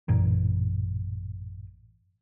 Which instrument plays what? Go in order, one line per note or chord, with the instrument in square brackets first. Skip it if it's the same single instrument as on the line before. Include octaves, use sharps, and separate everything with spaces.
[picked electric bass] A1 F#2 A#2 E3